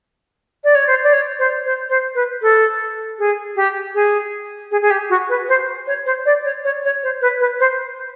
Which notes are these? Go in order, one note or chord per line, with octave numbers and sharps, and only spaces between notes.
D5
C#5
C5
D5
C#5
C5
C5
C5
B4
A4
G#4
G4
G#4
G#4
G#4
G4
F#4
B4
C5
C#5
C5
D5
C#5
C#5
C#5
C5
B4
B4
C5